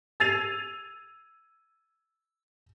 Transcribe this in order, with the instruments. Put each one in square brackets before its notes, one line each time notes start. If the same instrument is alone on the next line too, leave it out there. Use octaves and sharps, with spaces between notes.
[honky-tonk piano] E6 G#6 A6 C7 D#7 F7